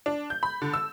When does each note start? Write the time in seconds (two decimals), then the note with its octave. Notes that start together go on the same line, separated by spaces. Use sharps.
0.06 D4
0.30 G6
0.43 B5
0.62 D3
0.74 E6